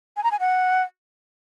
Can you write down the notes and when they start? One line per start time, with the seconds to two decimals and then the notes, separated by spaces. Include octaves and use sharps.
0.17 G#5
0.24 A#5
0.31 G#5
0.40 F#5